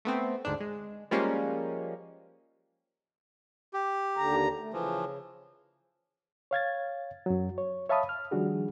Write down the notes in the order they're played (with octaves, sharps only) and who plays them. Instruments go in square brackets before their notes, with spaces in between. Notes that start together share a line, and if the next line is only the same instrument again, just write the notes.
[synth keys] A3 B3 C4
D2 G#2 D4
G#3
F3 G3 G#3 A#3 C#4
[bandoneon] G4
[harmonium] D#2 D3 A#5
A3
[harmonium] C#3 [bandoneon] E3 F3
[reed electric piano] C#5 F5 G#6 A6
F#2 F#3
C#5
C#5 E5 F5 A5 B5 D#6
F6
D#3 F3 G3 D4 F#4 G#4